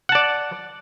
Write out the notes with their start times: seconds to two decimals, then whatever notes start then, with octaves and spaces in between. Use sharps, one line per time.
0.09 F#5
0.12 A5
0.15 D5